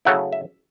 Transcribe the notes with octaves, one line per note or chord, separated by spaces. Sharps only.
C#3 F#3 A3 E4 F#5
E5